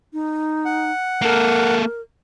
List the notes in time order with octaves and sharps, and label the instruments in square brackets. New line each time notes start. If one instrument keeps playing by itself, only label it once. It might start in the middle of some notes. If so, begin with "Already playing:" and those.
[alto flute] D#4
[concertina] F#5
[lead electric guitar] A#3 A4 [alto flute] A#4